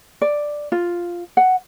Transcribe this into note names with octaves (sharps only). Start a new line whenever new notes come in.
D5
F4
F#5